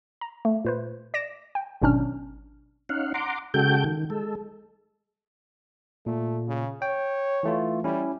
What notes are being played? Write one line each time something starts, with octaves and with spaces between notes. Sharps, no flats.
A#5
A3
A#2 B4 C5
D5 A#6 D7 E7
G5
G#1 B2 F#3 C#4 D4 F6
C#4 D#4 F5 F#5
F#5 A#5 C6 D6
C#3 G#3 F#4 A4 G5 G6
D#3
G#3 A4
A#2 A3
C#3
C#5 G5
E3 A3 F4
G3 C#4 E4